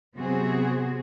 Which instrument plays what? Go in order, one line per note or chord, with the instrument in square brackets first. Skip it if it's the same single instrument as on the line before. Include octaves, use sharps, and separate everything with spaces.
[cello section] C3 F#3 B3 C4 F#4 G#4